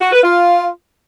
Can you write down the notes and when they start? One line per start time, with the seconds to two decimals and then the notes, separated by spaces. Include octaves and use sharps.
0.01 F#4
0.12 B4
0.24 F4